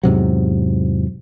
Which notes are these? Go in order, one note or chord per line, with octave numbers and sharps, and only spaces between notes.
E2 G#2 C3 F#3